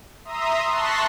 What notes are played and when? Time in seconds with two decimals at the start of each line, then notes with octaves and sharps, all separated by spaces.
0.25 E5 A#5 C6 D#6
0.69 A5 C6 C#6 F#6 A#6 B6